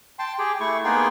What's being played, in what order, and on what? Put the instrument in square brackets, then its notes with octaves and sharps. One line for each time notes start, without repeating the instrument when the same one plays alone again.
[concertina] G5 A5 C6
G4 G#4 G5
A3 E4 C#6
A#3 B3 D#4 G#4 G5 C6